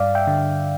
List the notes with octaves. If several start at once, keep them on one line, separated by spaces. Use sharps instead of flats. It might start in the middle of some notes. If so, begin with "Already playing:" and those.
Already playing: G2 D5 F5
E5 G5
D3